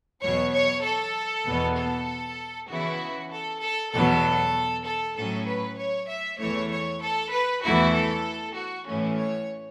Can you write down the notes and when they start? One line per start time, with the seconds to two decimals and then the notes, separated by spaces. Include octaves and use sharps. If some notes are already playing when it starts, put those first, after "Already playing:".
0.22 E2 B2 F#3 C#5
0.53 C#5
0.84 A4
1.46 E2 B2 B3
1.77 A4
2.69 C#3 E3 B3 E4 F#4
3.31 A4
3.61 A4
3.93 E2 B2 F#3 B3 A4
4.85 A4
5.16 A2 F#3 C#4 A4
5.47 B4
5.78 C#5
6.09 E5
6.39 E2 E3 A3 C#5
6.71 C#5
7.02 A4
7.32 B4
7.62 E2 E3 A3 E4 F#4
7.93 A4
8.56 F#4
8.86 A2 E3 A3 C#4
9.17 C#5